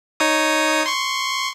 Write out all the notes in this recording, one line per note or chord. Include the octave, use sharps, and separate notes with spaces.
D#4 C#5 D#6
C6 C#6